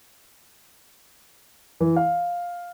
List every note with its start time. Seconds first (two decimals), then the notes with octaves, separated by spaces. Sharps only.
1.80 E3
1.96 F5